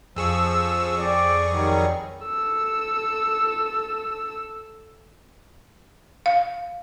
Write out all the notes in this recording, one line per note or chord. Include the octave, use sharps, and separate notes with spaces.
F2 F3 G#4 C#6 E6
C4 D5
D#3 F#3 G3
A4 E6
F5